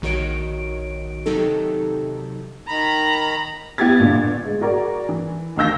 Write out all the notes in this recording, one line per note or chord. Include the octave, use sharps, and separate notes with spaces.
A#1 D#3 F#4 C#5 D7
C3 D#3 F#3 D#4 G4 A4
D#3 A#5 B5
B3 E4 G4 G#6 A6
G1 A#2 D3
G#3
F#4 G#4 A#4 D5
E3
D2 D#3 F5 E6 G6 A#6